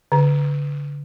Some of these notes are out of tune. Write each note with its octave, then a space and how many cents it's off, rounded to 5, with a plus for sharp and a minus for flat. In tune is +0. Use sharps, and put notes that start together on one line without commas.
D3 -30